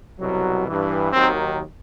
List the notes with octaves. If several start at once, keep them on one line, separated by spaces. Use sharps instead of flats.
C2 B2 F#3
G2 E3
D#2 D#3 F#3 C4